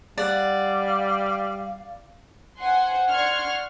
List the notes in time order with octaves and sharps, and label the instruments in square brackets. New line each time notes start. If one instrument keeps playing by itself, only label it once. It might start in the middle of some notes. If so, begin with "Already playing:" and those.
[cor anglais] G3 [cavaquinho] D5 F#5 [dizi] F5
[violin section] C5 F#5 G#5 C6
D5 F#5 C6 C#6 F6 G#6